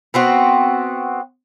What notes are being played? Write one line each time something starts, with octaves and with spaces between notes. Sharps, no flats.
B3 C4 F#4